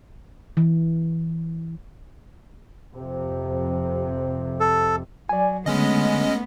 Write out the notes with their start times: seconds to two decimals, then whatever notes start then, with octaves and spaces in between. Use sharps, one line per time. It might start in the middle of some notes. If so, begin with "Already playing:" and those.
0.57 E3
2.95 F2 C3
4.60 A4
5.29 F#3 D5 G#5
5.66 D3 G#3 A3 B3 C#4 D#5